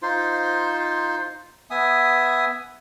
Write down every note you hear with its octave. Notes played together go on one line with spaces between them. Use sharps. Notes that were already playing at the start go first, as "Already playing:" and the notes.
D#4 F4 C5 C6
B3 E5 G#5 D#6